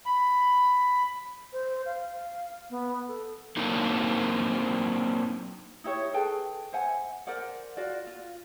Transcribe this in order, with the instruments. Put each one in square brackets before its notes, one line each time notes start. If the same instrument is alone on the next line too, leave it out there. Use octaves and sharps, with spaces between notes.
[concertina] B5
[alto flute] C5
F5
B3
A4
[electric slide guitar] F#3 A#3 C4 D4 D#4 A#4
[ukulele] D#4 E4 G4 C#5
G#4 A4 B4 G5
C5 E5 F#5 G#5
A#4 C5 D5 F#5
F4 F#4 D5
F4